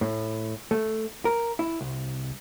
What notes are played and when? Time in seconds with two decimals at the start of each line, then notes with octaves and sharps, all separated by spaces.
0.01 A2
0.71 A3
1.25 A#4
1.59 E4
1.81 C2